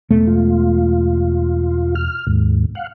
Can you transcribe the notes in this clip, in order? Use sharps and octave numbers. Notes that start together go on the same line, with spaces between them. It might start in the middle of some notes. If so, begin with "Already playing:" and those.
E1 A3
F4
F6
D#2 G#2
F5 F#5